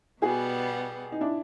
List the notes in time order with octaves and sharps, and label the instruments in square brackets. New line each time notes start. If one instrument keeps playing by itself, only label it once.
[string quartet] B2 G3 B3 [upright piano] F#4 G#4
[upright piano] D#4
D4 E4